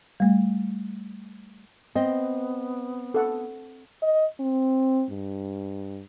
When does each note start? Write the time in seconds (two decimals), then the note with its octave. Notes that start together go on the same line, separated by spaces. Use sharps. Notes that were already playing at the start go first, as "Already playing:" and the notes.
0.20 G3 A3
1.95 B3 C4 D#5
3.14 A4 F#5
4.03 D#5
4.40 C4
5.11 G2